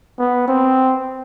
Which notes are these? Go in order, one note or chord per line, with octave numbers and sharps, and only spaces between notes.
B3
C4